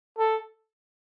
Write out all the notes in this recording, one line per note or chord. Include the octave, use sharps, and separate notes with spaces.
A4